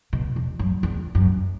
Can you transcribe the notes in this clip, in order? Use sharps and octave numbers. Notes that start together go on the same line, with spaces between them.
B2
E2
F#2
E2
F#2